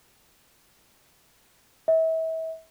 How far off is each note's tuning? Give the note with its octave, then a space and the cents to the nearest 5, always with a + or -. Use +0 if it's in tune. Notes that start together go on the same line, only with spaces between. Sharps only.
E5 -35